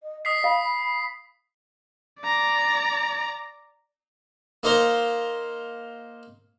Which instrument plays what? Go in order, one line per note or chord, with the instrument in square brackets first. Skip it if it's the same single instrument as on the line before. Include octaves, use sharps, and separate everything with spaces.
[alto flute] D#5
[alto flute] D#5 [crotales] D#6 B6 C7
[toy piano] F5 [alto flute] B5
[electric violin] D5 A#5
[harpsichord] A#3 D#4 A#4 C5